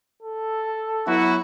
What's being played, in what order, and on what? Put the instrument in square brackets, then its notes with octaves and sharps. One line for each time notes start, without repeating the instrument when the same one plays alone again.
[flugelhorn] A4
[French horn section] F#3 B3 E4 [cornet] F#4